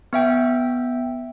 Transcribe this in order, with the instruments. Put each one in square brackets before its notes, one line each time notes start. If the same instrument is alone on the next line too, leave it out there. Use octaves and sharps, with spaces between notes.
[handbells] B3 E5 G5